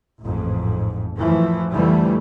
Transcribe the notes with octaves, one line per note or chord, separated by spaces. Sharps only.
A1 F2 G#2
F#2 E3 F3 A3
F2 D3 E3 G3 A3